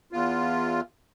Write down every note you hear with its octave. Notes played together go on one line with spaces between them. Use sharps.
E2 F4